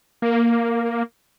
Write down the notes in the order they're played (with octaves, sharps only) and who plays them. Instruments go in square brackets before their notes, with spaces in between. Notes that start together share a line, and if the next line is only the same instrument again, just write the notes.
[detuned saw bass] A#3